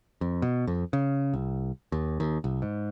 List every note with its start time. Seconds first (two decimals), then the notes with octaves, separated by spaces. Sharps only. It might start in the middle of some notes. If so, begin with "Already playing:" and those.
0.21 F2
0.42 B2
0.67 F2
0.93 C#3
1.34 C2
1.92 D#2
2.20 D#2
2.44 C2
2.62 G#2